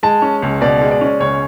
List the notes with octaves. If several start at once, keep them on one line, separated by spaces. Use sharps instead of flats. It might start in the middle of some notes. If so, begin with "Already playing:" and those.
G#3 A5
C#4
C#2
B2 D5
G#3
D5
C#4
C#2 C#5